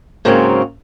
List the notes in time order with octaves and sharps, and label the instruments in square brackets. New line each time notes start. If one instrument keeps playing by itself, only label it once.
[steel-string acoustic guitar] G#2 C#3 F#3 A#3 C4 C#4